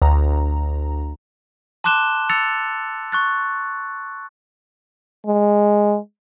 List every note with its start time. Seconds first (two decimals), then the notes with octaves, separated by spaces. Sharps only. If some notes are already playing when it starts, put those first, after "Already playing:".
0.02 D2 A#5
1.84 A5 C6 D6 F#6 E7 G7
2.29 E6 A6 C#7 F7
3.12 C#6 F#6 A6
5.26 G#3